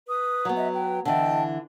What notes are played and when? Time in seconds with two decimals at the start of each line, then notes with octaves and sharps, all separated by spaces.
0.08 B4 D#6
0.45 F#3 B3
0.57 D#5 E5
0.73 B4 G5
1.05 D3 E3 D#5 G5 A5